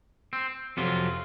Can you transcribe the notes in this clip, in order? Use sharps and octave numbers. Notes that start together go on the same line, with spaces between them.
C4
F2 C3 F#3 F4